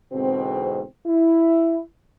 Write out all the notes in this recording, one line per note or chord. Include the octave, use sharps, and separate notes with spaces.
E2 G#2 B2 D3 C4
E4